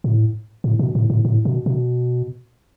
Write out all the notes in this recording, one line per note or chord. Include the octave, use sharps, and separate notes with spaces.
A2
A2
B2
A2
A2
A2
B2
B2